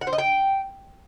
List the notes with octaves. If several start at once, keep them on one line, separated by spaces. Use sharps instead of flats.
F#5
C5
D#5
G5